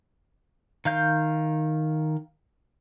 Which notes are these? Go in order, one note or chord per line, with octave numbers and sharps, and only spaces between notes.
D#3 F5 G6